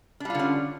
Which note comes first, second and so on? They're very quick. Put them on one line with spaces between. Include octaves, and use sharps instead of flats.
D4 G3 F4 D3 C#4